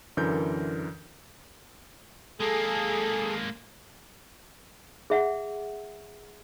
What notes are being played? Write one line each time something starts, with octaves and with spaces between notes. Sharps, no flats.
F#2 D3 E3 A#4 G6
G#3 A#3 G#4 A4
G#4 E5 F#5